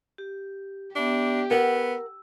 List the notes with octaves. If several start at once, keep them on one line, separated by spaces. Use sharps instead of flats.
G4
B3 D4 G4 E5
B3 A#4 F#5 E6